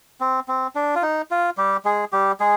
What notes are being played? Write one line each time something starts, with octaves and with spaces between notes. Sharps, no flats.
C4
C4
D4
F4
D#4
F4
G3 G4
G#3 G#4
G3 G4
G#3 G#4